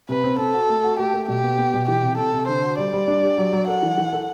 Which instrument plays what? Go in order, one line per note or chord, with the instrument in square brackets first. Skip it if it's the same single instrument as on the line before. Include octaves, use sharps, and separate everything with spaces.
[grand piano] C3 [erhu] B4
[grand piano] C4
[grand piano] C4 [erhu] A4
[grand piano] F#4
A3
F#4
[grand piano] A3 [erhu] G4
[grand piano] A3
[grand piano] B2 [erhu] G4
[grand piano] B3
B3
B2
[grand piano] E3 [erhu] G4
[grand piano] C3
[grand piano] C3 [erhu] A4
[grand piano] C3
[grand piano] D3 [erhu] C5
[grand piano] F#4
[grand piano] G3 [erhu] D5
[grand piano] G3
D4
G4
F#3
F#3
[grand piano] A4 [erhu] F#5
[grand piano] E3
E3
A4